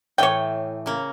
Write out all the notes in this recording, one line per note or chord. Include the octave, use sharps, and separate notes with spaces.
A2 E3 C#5 G5
C#3 A#3